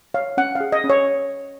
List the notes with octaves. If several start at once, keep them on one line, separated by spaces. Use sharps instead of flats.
C#5 F5
C#4 F#5
G#4 F5
D#5
C#4
C#5